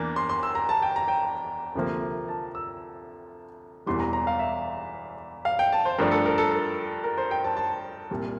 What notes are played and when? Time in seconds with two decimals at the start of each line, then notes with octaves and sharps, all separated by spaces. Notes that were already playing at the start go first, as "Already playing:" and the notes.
Already playing: E2 E3 A#3 D4
0.16 C6
0.29 C6
0.43 E6
0.55 A#5
0.69 A5
0.82 G5
0.96 A#5
1.08 G5
1.75 D2 C3 F3 A#3
2.28 A5
2.55 E6
3.86 E1 E2 E3 G3 C6
4.00 A#5
4.13 A#5
4.27 F5
4.39 E5
5.45 F5
5.59 G5
5.72 A5
5.85 C5
5.98 G2 F3 A3 D4 A#4
6.11 A4
6.25 A#4
6.38 A4
6.52 A4
7.04 A#4
7.18 C5
7.31 G5
7.44 A5
7.57 A5
8.11 C2 A#2 G3